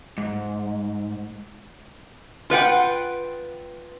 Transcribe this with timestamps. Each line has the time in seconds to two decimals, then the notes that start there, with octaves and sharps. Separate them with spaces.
0.18 G#2
2.50 F4 B4 F#5 G5